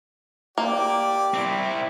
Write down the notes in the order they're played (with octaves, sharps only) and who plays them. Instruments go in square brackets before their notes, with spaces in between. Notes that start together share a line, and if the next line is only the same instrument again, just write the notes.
[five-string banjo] A#3 [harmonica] G4 D5
[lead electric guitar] C4 E4